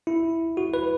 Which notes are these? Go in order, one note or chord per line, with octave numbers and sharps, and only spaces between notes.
E4
F#4
B4